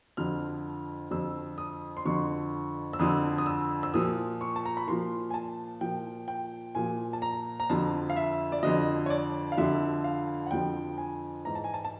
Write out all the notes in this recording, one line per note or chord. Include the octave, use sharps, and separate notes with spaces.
F2 D3 F3 F6
F2 D3 F3 E6
D#6
C6
F2 D3 F3 C#6
E6
F2 D3 F3 D#6
D#6
E6
E6
A#2 F3 D#6
C#6
A5
A#5
B5
A#2 F3 C6
G#5
A5
A#2 F3 G5
G5
A#2 F3 G#5
A5
A#5
A#5
F2 D3 F3 A5
F5
E5
D5
F2 D3 F3 D#5
C#5
D5
F5
F2 D3 F3 E5
F5
F#5
F2 D3 F3 G5
G#5
G#2 E3 A#5
A5
G#5
A5
A5